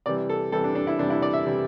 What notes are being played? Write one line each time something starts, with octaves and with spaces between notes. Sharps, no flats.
C3 E3 G3 D5
A4
C3 E3 G3 A4
D4
D4
E4
C3 E3 G3 D4
E4
D5
E5
C3 E3 G3